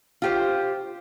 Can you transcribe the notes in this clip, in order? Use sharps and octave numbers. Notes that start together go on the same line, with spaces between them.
F4 G4 C5